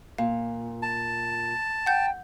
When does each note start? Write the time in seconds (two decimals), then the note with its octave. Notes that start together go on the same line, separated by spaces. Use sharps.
0.18 A#2 F5
0.82 A5
1.86 F#5 G5 G6